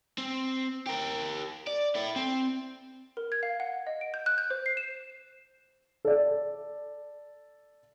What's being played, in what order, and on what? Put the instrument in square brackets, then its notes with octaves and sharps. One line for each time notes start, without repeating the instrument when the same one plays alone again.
[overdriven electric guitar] C4
G4 A#4
D5
E4 A4
C4
[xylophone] A#4
G#6
F5
F#5
D#5
D7
G6
F#6
G6
C5
C7
E7
[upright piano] A4 D5